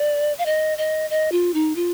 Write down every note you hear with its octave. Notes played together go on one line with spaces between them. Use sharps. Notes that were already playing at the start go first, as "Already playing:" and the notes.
Already playing: D5
F5
D#5
D#5
D#5
F4
D#4
F4